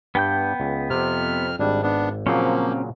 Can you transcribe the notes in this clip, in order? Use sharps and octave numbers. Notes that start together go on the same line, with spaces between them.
G2 B3 G5 G6
C#2
F2 C3 F6
G#1 G3 D4
B3 D4
A#2 C#3 F3 F#3 A#3 C4 C#4